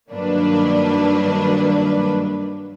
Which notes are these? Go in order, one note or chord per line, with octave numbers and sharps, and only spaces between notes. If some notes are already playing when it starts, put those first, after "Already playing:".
G2 D#3 F#3 A#3 D4 B4